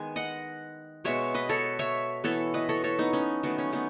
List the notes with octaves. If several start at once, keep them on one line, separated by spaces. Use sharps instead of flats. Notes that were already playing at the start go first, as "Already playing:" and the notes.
Already playing: D#3 G#3 B3 G#5
D#5 F#5
B2 G#3 B3 C#5 E5
B4 D#5
A4 C#5
C#5 E5
E3 B3 A4 C#5
B4 D#5
A4 C#5
A4 C#5
B3 D#4
C#4
D#3 F#3 A3 B3
C#4
B3 D#4